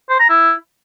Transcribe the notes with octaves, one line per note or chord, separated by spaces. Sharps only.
C5
A#5
E4